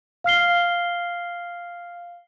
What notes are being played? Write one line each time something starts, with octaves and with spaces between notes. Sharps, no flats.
F5 F6 C7 G7